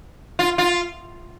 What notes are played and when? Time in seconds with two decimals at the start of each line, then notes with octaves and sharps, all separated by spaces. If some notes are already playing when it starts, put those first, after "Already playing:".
0.39 F4
0.58 F4